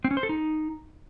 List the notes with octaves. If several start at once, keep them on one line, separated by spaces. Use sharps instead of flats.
C4
C#4
C5
A4
D#4